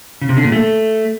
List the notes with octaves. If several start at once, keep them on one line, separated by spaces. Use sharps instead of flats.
C#3
C3
D3
A#2
A3